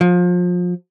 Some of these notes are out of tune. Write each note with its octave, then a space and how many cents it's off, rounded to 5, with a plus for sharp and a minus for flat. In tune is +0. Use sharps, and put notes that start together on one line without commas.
F3 +30